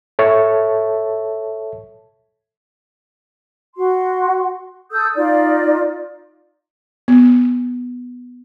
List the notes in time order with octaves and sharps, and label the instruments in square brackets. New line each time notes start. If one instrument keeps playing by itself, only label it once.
[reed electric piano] A4 C#5 E5 A5
[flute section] F#4 C6
A4 D#6 E6 G6
D#4 F4 D5
[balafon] B3